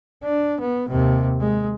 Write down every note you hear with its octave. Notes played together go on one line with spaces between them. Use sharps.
D4
B3
D#2 C3
G#3